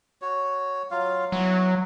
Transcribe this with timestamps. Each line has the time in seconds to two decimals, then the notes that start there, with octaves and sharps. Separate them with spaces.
0.22 F#4 C#5
0.91 F#3 F4 F5
1.32 F#3 B3 E4